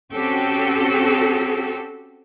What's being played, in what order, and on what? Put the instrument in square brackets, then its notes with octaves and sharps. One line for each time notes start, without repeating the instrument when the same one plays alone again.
[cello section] C4 C#4 F#4 G4 A4